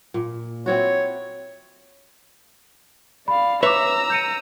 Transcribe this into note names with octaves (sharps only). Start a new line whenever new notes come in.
A#2
C4 E4 F#4 C#5
D5 F5 B5
B4 C#5 E5 A#5 D6 E6 F7
G6 C#7 D#7